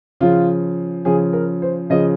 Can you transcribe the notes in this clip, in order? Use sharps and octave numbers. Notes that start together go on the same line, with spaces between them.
C#3 F3 F4
C#3 F3 G#4
A#4
C5
C#3 F3 D#5